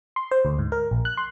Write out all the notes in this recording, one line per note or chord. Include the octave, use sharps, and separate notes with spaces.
C6
C5
D2
G#2
A#4
A#1
F#6
C6